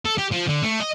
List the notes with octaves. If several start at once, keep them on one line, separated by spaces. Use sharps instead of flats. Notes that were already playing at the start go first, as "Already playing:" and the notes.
A4
G4
F3
D3
A3
D#5